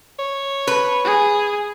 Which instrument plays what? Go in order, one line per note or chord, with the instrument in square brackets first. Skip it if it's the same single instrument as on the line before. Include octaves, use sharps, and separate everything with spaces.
[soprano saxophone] C#5
[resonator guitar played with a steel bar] B4
[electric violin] G#4